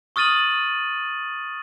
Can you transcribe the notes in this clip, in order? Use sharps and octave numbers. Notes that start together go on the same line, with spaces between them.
C#6 D#6 F6 A6 D#7 F#7